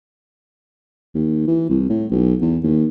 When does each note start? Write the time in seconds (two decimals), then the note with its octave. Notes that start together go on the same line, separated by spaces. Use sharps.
1.15 D#2
1.48 E3
1.69 C2
1.90 A2
2.11 B1
2.42 E2
2.63 D#2